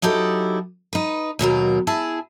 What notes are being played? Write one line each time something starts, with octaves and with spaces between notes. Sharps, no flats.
F#3 D#4 E4 G4 A4
D#4 B4
D#2 B2 F#3 A#4
E4 G#4 G#5 A5